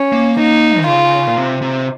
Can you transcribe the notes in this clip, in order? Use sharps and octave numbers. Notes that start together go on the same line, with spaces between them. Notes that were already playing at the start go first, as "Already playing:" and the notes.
Already playing: C#4
A#3
A#3 D#4
D#3
C#3 F4
A#2
C3
C3